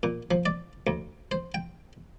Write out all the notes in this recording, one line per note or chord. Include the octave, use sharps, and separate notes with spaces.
A#2
F3
D5
D2
C5
G5